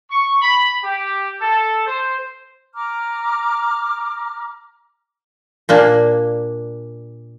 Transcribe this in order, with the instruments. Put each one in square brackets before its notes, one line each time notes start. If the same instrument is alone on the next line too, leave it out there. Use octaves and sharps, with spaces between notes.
[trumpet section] C#6
B5
G4
A4
C5
[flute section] A#5 D6 F6
[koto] A#2 A#3 D4